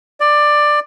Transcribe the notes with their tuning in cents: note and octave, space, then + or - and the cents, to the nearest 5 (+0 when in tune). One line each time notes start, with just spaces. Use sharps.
D5 +15